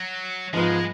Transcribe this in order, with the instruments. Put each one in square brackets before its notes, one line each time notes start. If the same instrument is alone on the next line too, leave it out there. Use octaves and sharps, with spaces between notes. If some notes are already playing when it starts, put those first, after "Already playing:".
Already playing: [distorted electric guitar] F#3
[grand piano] G#2 F3 B3 F4 B4 [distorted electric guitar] G#3